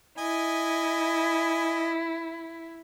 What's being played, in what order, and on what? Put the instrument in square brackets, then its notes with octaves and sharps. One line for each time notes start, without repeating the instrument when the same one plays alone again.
[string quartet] E4 [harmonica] D#5 G#5